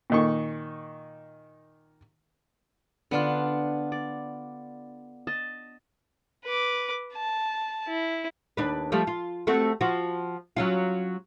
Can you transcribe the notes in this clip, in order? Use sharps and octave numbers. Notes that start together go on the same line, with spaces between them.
A#2 D#3 C#6
D3 B3 D4 F4
D5
D#5 A5
B4 D6
A5
E4
D#2 D4 B4
F3 G3 A3
F4
A3 C4 F#4
F3 F#4
F#3 C#4 F4